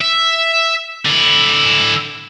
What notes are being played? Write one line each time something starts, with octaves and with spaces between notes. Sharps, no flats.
E5
D3 E4